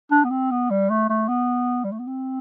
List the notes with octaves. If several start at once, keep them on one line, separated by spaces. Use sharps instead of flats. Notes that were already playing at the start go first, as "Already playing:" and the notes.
D4
B3
C4
B3
G3
A3
A3
B3
G3
A3
B3
C4